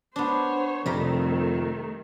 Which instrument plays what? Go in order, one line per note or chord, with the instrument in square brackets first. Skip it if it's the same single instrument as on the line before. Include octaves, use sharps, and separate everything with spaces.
[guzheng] B3 D4 [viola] C5 C#5
[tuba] F2 [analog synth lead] C3 [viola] D#3 A3 [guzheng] G3 A#4